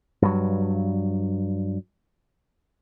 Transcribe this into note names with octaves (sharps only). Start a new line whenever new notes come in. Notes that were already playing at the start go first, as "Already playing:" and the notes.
G2 F#3